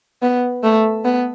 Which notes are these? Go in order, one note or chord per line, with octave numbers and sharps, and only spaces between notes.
B3
A3
B3